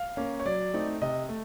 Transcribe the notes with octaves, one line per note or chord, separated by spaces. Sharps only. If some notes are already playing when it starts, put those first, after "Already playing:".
Already playing: F5
A#3 C#4
C#5
F#3 D5
A3 C4 D#4
C3 D#5
A3